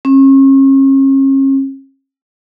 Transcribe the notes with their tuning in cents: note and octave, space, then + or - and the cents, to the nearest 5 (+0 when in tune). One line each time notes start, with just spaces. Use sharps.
C#4 -40